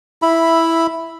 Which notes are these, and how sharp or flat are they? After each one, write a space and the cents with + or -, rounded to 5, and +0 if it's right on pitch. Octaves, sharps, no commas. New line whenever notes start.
E4 +0 E5 +0 B5 +0